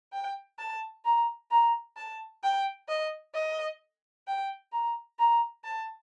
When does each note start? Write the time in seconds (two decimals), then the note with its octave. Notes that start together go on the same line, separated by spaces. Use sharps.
0.13 G5
0.59 A5
1.05 A#5
1.51 A#5
1.96 A5
2.43 G5
2.88 D#5
3.34 D#5
4.27 G5
4.72 A#5
5.19 A#5
5.64 A5